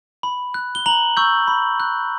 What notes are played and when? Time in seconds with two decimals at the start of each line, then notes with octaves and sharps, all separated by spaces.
0.23 B5
0.54 F#6
0.75 G7
0.86 A#5 F#7
1.17 C#6 E6 G6
1.48 B5
1.80 F#6